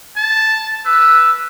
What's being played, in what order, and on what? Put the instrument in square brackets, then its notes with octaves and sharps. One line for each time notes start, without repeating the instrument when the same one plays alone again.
[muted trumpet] A5
[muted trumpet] B4 [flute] E6